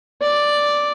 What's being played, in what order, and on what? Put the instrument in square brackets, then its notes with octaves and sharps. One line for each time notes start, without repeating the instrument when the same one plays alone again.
[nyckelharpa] D5